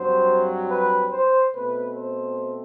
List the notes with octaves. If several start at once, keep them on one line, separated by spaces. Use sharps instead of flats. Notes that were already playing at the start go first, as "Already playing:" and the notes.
Already playing: G2 F#3 C4 C5
B4
C5
B2 A3 C4 B4
C5